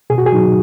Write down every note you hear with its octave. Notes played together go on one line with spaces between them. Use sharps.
B2 G#4
F#4
G#4
F#3 D#4